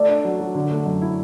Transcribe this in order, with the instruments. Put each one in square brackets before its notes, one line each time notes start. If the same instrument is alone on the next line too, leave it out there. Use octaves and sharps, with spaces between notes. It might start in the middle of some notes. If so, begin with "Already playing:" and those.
Already playing: [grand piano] A3 [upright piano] D5
[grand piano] D4
F#3
F#3
D3
A3
F#2
E4